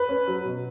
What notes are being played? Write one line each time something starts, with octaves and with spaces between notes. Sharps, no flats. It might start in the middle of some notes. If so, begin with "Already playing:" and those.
Already playing: B4
C#4
F#3
B2